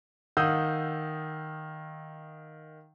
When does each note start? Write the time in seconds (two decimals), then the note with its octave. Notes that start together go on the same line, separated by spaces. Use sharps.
0.37 D#3 F5 F#5 D#6 E6 G6